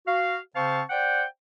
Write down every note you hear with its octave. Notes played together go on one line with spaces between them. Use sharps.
F#4 F5
C#3 C4 C5 F5 A5 C#6
C5 D5 F#5 G5